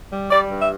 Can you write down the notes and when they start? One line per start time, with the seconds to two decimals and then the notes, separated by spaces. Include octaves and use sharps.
0.11 G3
0.31 G3 D5
0.49 G2
0.60 E5